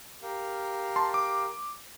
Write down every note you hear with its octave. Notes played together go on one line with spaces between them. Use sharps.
G4 A#4 F5
A5 C6
D6